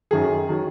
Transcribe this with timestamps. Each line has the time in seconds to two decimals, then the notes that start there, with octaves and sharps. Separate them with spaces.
0.11 F#2 D#3 F#3 G#4
0.49 D#3 F#3